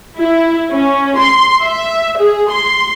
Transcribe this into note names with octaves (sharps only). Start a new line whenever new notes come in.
E4
C#4
C6
E5
G#4
C6